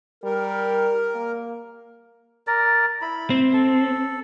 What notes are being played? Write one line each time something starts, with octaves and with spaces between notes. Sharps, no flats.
G3 A#4
A#3
A#4 D5
E4 B5
C4
A4